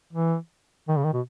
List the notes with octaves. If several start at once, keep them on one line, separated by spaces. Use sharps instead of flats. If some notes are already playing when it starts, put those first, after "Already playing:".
E3
D#3
C#3
D#3
B2